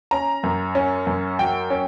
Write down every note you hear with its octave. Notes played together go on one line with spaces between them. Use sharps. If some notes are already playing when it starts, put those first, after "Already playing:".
C#4 A#5
F#2
C#4
F#2
F#3 G5
C#4